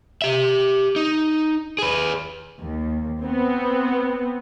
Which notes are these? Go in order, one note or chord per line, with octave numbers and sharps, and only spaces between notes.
G4 E5
D#4
G#4 B4
D#2
B3 C4